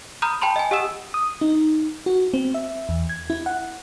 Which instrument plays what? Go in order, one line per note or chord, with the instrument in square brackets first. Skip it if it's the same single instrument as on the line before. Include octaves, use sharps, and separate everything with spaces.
[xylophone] A#5 B5 D#6 F6 G6
G5 A5 B5 C6
D#5 G#5
G4 D#5 F#5 D#6 E6 E7
[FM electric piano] D#6
D#4
F#4
C4
E5
E2
G#6
E4
F#5